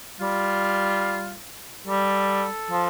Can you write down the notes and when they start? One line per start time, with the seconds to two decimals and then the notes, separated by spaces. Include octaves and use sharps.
0.21 G3 F4
1.88 G3 A4
2.71 F3